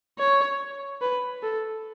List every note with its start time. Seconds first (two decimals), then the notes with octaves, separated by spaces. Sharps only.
0.19 C#5
1.02 B4
1.43 A4